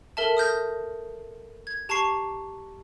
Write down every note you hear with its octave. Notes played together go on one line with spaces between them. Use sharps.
A4 A#4 E5 A5
D#6 F6 G6 A#6
G#6
G4 A5 A#5 C#6 C7